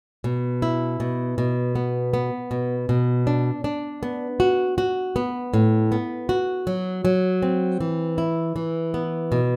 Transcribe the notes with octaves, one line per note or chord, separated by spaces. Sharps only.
B2
E4
B2
B2
B3
B3
B2
B2
D4
D4
B3
F#4
F#4
B3
A2
B3
F#4
F#3
F#3
C4
E3
E4
E3
B3
B2